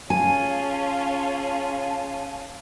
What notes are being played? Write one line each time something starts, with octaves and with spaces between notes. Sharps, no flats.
C#4 F4 G#4 F5 G#5 A5